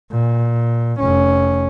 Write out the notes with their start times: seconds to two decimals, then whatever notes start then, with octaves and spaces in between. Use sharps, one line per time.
0.11 A#2
1.00 F1 C#4